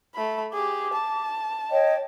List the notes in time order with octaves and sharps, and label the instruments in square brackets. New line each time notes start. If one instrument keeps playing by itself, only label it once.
[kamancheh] A3 B5
[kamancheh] G4 G#4 [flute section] D6
[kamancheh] A5
[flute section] C#5 D#5 G5